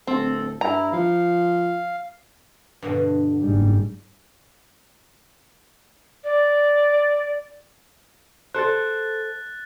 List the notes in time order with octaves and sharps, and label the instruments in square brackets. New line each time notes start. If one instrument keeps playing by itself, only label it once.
[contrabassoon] D1 [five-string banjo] C4 [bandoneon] A4
[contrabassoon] G2 [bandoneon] E4 [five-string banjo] A#5
[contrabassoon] F3 [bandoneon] F5
[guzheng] G2 B2 D3
[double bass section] F#1 G#2 G3
[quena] D5
[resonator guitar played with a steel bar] A4 C5 [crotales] F#6 A6